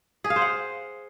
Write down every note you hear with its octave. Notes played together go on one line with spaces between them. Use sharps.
G#4
F5
C5
F#5